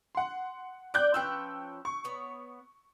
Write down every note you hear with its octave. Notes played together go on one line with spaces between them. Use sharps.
F#5 C6
D5 G5 D6 F#6 G6
F3 C#4 B4 G5 E6
C#6
B3 C#5